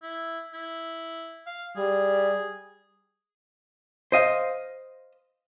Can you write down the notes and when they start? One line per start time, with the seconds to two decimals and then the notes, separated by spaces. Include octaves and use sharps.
0.03 E4
0.53 E4
1.47 F5
1.77 G3 G#4
4.12 C5 D#5 F5